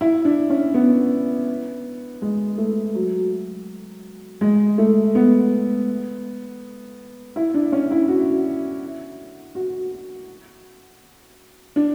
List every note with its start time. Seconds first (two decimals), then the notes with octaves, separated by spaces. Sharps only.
0.01 E4
0.25 D4
0.50 C#4
0.74 B3
2.22 G#3
2.58 A3
2.95 F#3
4.41 G#3
4.78 A3
5.15 B3
7.36 E4
7.54 D4
7.72 C#4
7.91 E4
8.08 F#4
9.55 F#4
11.76 D4